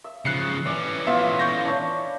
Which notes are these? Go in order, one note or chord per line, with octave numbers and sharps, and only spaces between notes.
E5
C#3 F3 F#6 C7 C#7
E3 C#4 D5
B3 F4 E5
C#6 G6 A#6
D4 E4 C#5